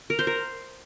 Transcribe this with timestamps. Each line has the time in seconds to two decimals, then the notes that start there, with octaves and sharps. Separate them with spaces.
0.10 A#4
0.19 C5
0.27 A#4